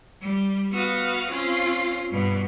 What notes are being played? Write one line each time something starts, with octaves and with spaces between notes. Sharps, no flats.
G3
B3 F#4 F5 D#6 F6
C4 C#4 F4
G2 B2